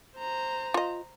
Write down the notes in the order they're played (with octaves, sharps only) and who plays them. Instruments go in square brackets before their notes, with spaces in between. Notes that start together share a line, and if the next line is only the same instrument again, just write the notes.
[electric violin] C5 A#5
[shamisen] F4 D#5